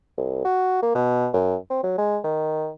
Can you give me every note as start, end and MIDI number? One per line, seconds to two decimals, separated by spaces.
0.18 0.42 36
0.45 0.79 66
0.82 0.94 58
0.95 1.28 47
1.34 1.56 42
1.70 1.79 60
1.83 1.96 54
1.98 2.19 56
2.24 2.70 51